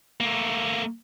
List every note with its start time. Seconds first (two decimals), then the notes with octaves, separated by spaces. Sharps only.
0.21 A3 A#3